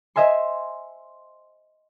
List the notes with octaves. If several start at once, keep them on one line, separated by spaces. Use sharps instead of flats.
C5 D#5 E5 G#5 C6